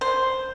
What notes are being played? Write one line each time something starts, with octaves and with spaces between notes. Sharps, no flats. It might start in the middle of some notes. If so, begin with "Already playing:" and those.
C5